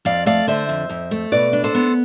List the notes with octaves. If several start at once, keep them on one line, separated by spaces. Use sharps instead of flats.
F2 D5 F5
A3 D5 F5
D3 C5 E5
F2
F2
A3
B2 B4 D5
D4
A4 C5
B3